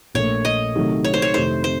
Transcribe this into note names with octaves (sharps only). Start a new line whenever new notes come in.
A#1 A#2 A3 C#5
D#5
C3 D#3 F#3 A3
C#5
C5
C#5
F2 C3 D#3 A3 C5
C5